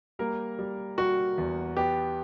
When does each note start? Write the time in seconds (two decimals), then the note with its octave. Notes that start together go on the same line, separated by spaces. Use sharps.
0.19 G3 A#3 A#4
0.59 G3
0.98 G3 F#4
1.38 E2
1.77 B3 G4